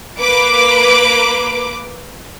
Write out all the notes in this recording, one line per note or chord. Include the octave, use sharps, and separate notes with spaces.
A#3 B4 D6